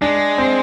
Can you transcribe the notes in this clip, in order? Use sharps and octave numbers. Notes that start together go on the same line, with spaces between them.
G#3 D4
C4